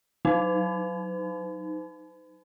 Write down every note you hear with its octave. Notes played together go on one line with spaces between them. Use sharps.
F#3 D#4